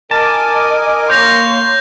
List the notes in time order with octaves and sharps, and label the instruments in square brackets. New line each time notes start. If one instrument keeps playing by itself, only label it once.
[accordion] A#4 G#5 D6 [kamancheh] D#5 [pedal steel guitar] A5
[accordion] A#3 [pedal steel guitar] C#5 [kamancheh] C6 [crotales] G6 A#6 F7